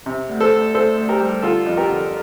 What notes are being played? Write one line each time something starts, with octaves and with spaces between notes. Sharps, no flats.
C3
D2
A4 C5
D2
D2 A4 C5
D2
G4 A#4
G3
D3 F4 A4
F2
G4 A#4
D3